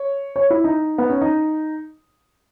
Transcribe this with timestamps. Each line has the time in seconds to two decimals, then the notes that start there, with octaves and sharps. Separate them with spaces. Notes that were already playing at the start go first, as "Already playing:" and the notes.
Already playing: C#5
0.36 C#5
0.50 E4
0.64 D#4
0.98 B3
1.10 C#4
1.21 D#4